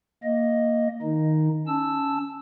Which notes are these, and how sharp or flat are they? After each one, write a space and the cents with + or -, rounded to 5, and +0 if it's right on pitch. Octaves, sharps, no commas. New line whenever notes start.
A#3 +0 D#5 +5
D#3 +0 D#4 +0
C#4 +10 A5 +0 E6 +0